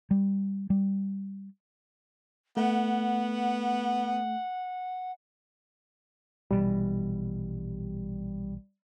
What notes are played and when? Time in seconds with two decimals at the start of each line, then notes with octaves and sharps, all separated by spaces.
0.11 G3
0.70 G3
2.57 A3 B3 F#5
6.51 A#1 B2 E3 G3